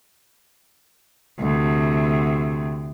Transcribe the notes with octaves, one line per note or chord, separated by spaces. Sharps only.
D2 C3